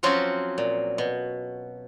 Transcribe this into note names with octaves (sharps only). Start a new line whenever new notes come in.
F3 F#3 C4 C#4 F4 F#4
A#2
B2